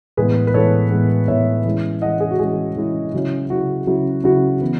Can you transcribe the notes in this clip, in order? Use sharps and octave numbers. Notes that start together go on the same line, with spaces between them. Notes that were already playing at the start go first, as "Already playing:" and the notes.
A2 E3 G#3 B3 G#4 B4
B4
A2 E3 G#3 B3 A4 C#5
A2 E3 G#3 B3
A2 E3 G#3 B3 C#5 E5
E3 G#3 C#4 E4
E3 G#3 C#4 E4 D#5 F#5
G#4
F#4
E3 G#3 C#4 E4 G#4
E3 G#3 C#4 E4
C#3 F#3 C#4 E4
C#3 F#3 C#4 E4 F#4
C#3 F#3 C#4 E4
C#3 F#3 C#4 E4 F#4
E3 B3